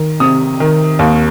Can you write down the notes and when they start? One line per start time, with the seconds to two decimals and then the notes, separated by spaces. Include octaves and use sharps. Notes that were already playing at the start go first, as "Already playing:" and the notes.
Already playing: D#3
0.20 C3 D#6
0.60 D#3
0.99 D#2